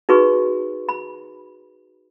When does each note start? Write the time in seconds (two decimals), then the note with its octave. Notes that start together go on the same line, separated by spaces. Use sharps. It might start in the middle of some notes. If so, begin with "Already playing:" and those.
0.09 D#4 F#4 G#4 B4 C#6
0.89 B5